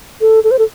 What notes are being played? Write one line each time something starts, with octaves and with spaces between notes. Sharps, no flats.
A4
A4
C5
A4